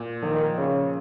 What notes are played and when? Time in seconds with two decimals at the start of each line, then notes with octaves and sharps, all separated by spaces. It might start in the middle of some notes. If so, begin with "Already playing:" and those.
Already playing: A#2
0.22 D#3 F3
0.58 A#2 C#3